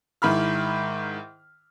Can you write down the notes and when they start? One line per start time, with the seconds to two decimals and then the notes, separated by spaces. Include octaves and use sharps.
0.22 G#2 D#3 E4 B5 F6